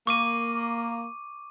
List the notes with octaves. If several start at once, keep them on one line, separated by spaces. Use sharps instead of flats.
A#3 C#6 D6 D#7